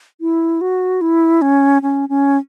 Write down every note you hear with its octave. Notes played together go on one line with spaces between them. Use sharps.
E4
F#4
E4
C#4
C#4
C#4